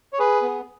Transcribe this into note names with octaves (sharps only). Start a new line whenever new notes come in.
C#5
G#4 B4
B3